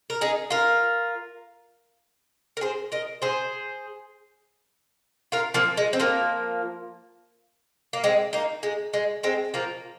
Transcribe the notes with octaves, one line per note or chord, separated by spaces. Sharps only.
A#4
D#4 G#4
F4 A#4
A#4
G#4 C5
A#4 D#5
G#4 C5
F4 A#4
F3 A#3
G#3
C4
F3 A#3
A#3
G#3 C4
A#3 D#4
G#3
G#3
G#3 C4
F3 A#3